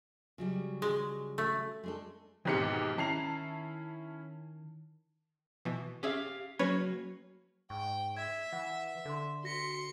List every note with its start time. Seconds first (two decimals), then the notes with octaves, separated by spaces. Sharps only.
0.38 C#3 F#3 G3
0.82 G#3
1.38 A3
1.84 G#3 D4 A4
2.45 D#2 G#2 B2 E3 C4 G4 C#7
2.98 D#3 C#4 E4 A5 A#5 C7 F7
5.65 B2 E3
6.03 C#4 G4 G#4 E5 F5
6.59 F#3 A#3 C#4 F#4 B4 C#5
7.70 G#2 G5 C#6
8.17 E5 G#6
8.53 E3 F#5
9.05 D3 A4 C6
9.44 F#4 C6 A#6 B6 C#7